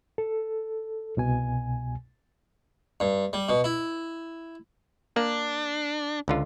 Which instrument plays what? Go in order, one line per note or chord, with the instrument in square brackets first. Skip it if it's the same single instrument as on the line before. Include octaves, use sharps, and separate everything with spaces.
[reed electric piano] A4
C2 B2 G#5
[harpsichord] G2
G3
B2
E4
[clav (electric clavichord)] A#3 [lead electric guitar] D4
[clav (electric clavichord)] C#2 D3 F4